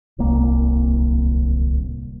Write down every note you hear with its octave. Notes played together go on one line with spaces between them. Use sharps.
D1 C2 A#3